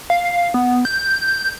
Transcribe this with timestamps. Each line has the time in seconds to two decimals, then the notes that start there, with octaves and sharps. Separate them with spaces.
0.10 F5
0.54 B3
0.85 G6